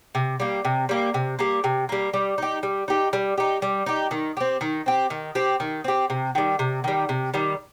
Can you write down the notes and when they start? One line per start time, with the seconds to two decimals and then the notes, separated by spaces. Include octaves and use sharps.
0.15 C3
0.40 G3 A#3
0.65 C3
0.89 G3 A#3
1.14 C3
1.39 G3 A#3
1.64 C3
1.89 G3 A#3
2.14 G3
2.38 D#4 G4
2.63 G3
2.88 D#4 G4
3.13 G3
3.38 D#4 G4
3.62 G3
3.86 D#4 G4
4.11 D#3
4.37 C4 G4
4.61 D#3
4.86 C4 G4
5.10 D#3
5.35 C4 G4
5.60 D#3
5.84 C4 G4
6.10 C3
6.35 D#3 G3
6.59 C3
6.84 D#3 G3
7.09 C3
7.34 D#3 G3